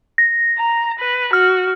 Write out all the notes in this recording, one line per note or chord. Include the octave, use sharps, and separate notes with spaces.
A#6
A#5
B4
F#4 F6